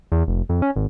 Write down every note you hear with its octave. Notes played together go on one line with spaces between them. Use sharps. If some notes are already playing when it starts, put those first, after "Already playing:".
E2
F1
F2
C#4
G#1